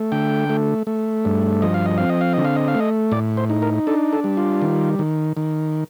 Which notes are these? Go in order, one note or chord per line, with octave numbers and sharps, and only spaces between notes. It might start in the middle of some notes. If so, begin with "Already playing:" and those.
Already playing: A3
D3 G5
A3
A3
G2
F3 D#5
F5
D#5
C4 F5
D#5
F5
D3 D#5
F5
D#5
F5
A3
D#5
A2 D5
C5
D#4
A#4
D4 A4
A4
G3
F4
D#3
D#3
D#3